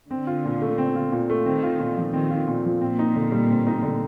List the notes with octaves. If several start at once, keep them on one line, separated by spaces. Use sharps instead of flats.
D3 C4
F4
A#2
A3
C4
F4
A#2
A3
D#3 C4
F4
A#2
F3
D#3 C4
F4
A#2
F3
A#2 C4
D#4
D3
G3
C4
D#4
D3